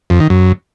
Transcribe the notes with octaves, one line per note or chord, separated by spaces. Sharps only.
F2
D#3
F#2